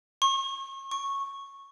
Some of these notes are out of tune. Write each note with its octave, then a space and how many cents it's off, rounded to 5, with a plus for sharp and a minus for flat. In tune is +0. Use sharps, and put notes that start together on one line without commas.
C#6 -35
C#6 -10